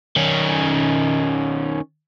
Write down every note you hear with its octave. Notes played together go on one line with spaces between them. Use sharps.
D#3 C#4